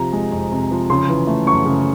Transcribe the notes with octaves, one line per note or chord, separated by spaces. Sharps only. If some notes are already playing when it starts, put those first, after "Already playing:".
Already playing: C3 F3 A#5
G#3
F2
C3
F3
C#3 C6
E3
A3
F#2 C#6
C#3